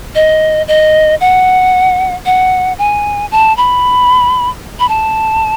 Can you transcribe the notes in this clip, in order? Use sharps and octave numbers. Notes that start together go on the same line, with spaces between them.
D#5
D#5
F#5
F#5
G#5
A5
B5
B5
A5